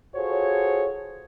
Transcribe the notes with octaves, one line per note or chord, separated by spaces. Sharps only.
F4 F#4 G#4 A4 C5 C#5